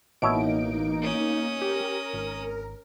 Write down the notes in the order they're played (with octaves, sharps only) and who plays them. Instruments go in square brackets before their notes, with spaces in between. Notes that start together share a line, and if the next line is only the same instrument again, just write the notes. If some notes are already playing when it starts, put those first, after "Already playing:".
[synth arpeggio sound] A1 E3 D7 [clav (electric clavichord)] B2 C#5 E5 [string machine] A#3 D#4
[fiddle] C#4 D#6
[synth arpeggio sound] G4 [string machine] A#4
[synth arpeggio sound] G#1